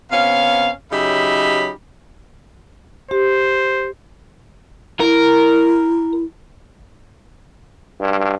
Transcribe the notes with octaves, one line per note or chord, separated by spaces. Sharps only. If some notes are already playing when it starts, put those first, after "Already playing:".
C3 B3 C#4 F5
C#3 F#3 D#4 G4 E5 B5
G4 C5
E4 A#4
G2